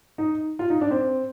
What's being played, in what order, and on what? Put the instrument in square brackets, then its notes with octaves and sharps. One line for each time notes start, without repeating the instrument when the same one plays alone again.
[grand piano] D#4
F4
D#4
D4
C4